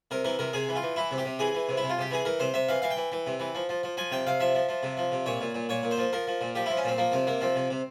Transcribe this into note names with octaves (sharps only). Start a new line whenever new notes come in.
C3 A#4
E3 A#4
C3 A#4
C3 G#4
E3
F4
E3
E3 E4
C3
G4
C3
E3 G#4
E3
C3
E4
C3
F4
C3 G4
E3 G#4
E3 A#4
C3 C5
C3 E5
E3 F5
E3 F5
G5
E3
E3
C3
E3
F3
F3
F3
F3 G#5
C3 G5
C3 F5
F3 E5
F3
F3
C3
F3
C3
A#2 C#5
A#2
A#2
A#2 C#5
A#2
C5
F3
F3 A#4
F3
A#2
F3 G4
F3 E4
C#4
A#2 C4
F3 A#3
C3 C4
C3 A#3
F3 C4
C3
C3